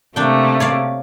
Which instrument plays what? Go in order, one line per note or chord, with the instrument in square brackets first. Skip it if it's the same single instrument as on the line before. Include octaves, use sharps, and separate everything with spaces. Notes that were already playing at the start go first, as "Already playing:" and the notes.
[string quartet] C3 A3 A#3 [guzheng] D4 G5
[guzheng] C#5 D5 F5